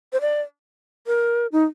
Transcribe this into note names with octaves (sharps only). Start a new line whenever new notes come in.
C5
D5
A#4
D#4